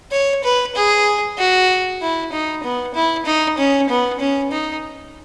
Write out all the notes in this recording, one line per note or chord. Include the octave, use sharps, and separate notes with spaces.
C#5
B4
G#4
F#4
E4
D#4
B3
E4
D#4
C#4
B3
C#4
D#4